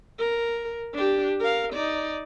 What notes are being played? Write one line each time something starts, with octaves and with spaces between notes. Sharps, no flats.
A#4
D4 G4
A#4 F5
D#4 D5